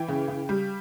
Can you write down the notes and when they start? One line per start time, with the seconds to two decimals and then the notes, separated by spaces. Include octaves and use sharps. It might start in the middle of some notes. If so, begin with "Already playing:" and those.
Already playing: E3 G5
0.08 C#3
0.28 C#3
0.49 G3